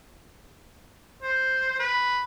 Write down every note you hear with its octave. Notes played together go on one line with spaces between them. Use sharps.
C5
B4